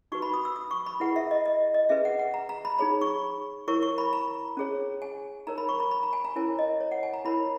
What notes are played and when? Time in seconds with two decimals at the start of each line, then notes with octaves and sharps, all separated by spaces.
0.12 D#4 F#4 B4 C#6
0.22 B5
0.34 D#6
0.45 E6
0.56 D#6
0.71 C#6
0.86 B5
1.00 E4 G#4 B4 F#5
1.16 E5
1.31 D#5
1.46 D#5
1.74 D#5
1.89 C#4 G#4 B4 E5
2.05 F#5
2.19 F#5
2.34 A#5
2.49 A#5
2.65 B5
2.78 D#4 G#4 C#5 B5
3.01 C#6
3.68 E4 A#4 C#5 C#6
3.83 C#6
3.98 B5
4.13 A#5
4.57 C#4 G#4 C#5
5.02 G#5
5.47 D#4 A#4 C#5 A#5
5.58 B5
5.69 C#6
5.80 B5
5.91 B5
6.03 A#5
6.13 G#5
6.25 A#5
6.36 C#4 E4 A#4 C#5 G#5
6.59 D#5
6.81 C#5
6.91 F#5
7.03 G#5
7.13 A#5
7.25 E4 A#4 C#5 B5